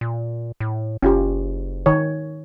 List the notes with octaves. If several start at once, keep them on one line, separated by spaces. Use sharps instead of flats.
A#2
A2
F#1 C#4 F4 G4
D#3 C#5